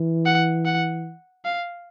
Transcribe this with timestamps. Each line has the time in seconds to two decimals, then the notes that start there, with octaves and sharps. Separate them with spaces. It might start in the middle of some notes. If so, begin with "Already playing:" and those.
Already playing: E3
0.26 F#5
0.65 F#5
1.45 F5